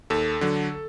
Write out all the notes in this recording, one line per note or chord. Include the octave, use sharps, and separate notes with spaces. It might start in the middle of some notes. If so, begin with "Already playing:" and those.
D#2 A4
D3 F#3